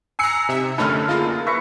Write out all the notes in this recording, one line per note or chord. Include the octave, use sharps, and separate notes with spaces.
G#5 A#5 E6 F#6 C7 C#7
C3 D#4 E5
F#1 D3 A3 C#4 D#4 E4 A5 F6
A#3 D#4 F4 G#4
E4 B4 E5 C#6 A#6 C#7